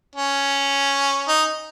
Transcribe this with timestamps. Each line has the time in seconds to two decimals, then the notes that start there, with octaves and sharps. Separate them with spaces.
0.15 C#4
1.28 D#4